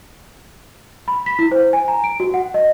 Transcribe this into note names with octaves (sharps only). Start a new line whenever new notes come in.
B5
B6
E4
C5
G#5
A#5
D7
F#4
F#5
D#5